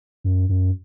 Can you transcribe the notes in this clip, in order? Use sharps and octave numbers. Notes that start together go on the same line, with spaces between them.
F#2
F#2